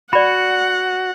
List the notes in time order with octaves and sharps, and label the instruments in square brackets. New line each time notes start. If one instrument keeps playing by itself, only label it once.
[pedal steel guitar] F#4 [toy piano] D5 B5 [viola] F#5